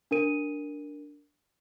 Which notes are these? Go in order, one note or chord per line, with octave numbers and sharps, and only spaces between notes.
D4 A#4 D#7